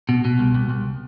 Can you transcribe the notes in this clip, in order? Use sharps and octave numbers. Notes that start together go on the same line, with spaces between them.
B2
B2
C2
C2
C2